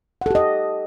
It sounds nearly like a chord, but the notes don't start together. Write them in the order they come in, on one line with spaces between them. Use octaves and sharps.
F#5 A4 G4 D#5